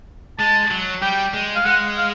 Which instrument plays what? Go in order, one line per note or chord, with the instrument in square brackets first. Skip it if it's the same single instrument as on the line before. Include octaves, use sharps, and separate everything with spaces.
[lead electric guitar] G#3 [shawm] A5
[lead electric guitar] F#3
[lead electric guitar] G3 [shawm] G5
[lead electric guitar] G#3
[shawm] F5
[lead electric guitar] G#3 [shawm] F#5
[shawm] F5